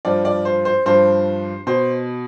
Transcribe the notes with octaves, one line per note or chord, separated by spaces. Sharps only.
G2 F3 D5
D5
C5
C5
G2 F3 C5
B2 C5